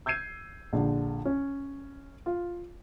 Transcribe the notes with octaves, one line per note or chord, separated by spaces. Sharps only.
E6 G6 G#6 C7 D#7
A#1 D3
C#4
F4